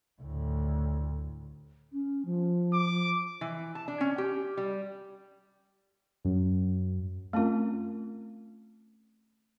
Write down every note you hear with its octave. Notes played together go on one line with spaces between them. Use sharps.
D2 A2
C#4
F3
D6
E3
A5
D4
C#4
G4
G3
F#2
A3 C4 C#4 F4 A#4